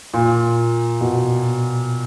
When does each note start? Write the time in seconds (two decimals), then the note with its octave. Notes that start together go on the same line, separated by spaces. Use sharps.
0.14 A#2
1.01 B2